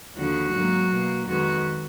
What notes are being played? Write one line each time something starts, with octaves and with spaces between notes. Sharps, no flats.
D#2 D3 F3 F#4
G#2 F#3 A#3
B2 A#3
F2 D#3 G#3 B3 F#4